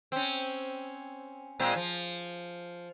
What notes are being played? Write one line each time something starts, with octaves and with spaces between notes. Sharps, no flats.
C4 C#4
A#2 G#3 C4
F3